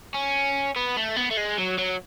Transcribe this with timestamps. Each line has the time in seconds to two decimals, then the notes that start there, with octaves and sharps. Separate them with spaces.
0.14 C#4
0.76 B3
0.97 A3
1.16 B3
1.31 A3
1.37 G#3
1.58 F#3
1.78 F#3